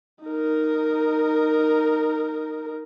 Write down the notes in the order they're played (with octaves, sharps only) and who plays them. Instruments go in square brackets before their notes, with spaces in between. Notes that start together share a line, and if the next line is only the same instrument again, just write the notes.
[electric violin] D#4 A#4